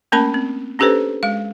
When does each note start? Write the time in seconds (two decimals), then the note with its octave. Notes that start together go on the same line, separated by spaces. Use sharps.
0.12 A3 A#3 C#4 A#4 A5 B5
0.34 C4
0.79 C#4 D4 G4 A4 B4 C5
1.23 G#3 F5